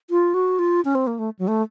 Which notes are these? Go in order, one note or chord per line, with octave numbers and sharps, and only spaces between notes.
F4
F#4
F4
C#4
C4
A#3
A3
F#3
A3